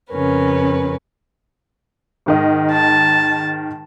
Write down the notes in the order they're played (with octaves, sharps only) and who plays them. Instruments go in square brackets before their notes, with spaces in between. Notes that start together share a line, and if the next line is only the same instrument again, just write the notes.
[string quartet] F2 C#3 C#4 A#4 B4
[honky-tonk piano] G#2 D#3 D#5
[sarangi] A5